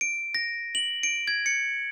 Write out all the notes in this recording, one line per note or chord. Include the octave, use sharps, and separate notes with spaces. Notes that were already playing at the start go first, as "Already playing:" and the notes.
D7
A#6
F#7
D7
G#6
C#7